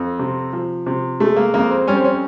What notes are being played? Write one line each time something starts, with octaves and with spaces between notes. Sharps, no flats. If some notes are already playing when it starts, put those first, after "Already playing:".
Already playing: F2
C3
F3
C3
G#3 A3
A#3
F2 A#3
C4
G3 C#4
C4
C#4